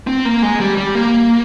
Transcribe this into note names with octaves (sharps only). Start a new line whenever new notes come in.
C4
A#3
G#3
G3
G3
A#3